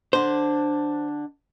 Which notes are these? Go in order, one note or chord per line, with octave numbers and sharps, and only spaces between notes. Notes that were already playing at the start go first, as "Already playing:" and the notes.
D3 D4 C5